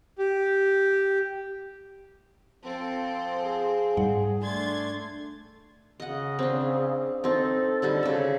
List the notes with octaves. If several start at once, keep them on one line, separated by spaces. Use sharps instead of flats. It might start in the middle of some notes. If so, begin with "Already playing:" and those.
G4
F3 C4 A4
G#4
G#2 G3 F#5
A3 D4 C6 G#6 A6
C#3 D#5 F#5
C4 D4
C4 D#4 A4
D3 G3 D#4
C#3 E5